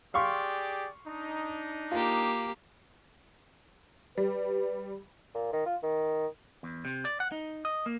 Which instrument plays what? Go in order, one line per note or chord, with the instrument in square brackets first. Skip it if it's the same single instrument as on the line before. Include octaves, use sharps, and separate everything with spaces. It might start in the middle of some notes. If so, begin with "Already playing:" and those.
[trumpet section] G4 G#4 D5 [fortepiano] F5 C6 C#6
[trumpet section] D4 D#4
[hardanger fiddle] A#3 G4 [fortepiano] F4
[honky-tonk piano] G3 [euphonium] B4
[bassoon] A#2
D#3
F4
D#3
[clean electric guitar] E2
C3
D5
F#5
D#4
D#5
A#3